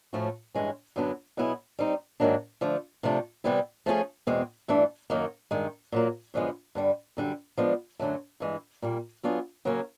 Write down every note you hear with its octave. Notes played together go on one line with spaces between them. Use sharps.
A2 F3 A3 C#4 F#4
G2 E3 G#3 C#4
F#2 D3 F#3 B3 D4
B2 F#3 B3 E4 G#4
G3 C4 D#4
G#2 D#3 F#3 A#3 D4
D3 F3 A3
C3 F3 A3 D4
C3 E3 G3 B3 E4
F3 A3 C#4 E4 G#4
E2 B2 G#3 C4
G2 E3 A3 D4
F#2 D#3 F#3 A#3
G2 D#3 G#3
A#2 F#3 A#3
F#2 D3 F3 G#3 B3
G2 D3 G3
F#2 D3 G3
F3 G#3 B3 D4
F#2 D3 F#3 A3
G2 E3 G#3
A#2 G3 A#3
F#3 B3 D4 F4 G#4
C#3 F#3 A#3 C#4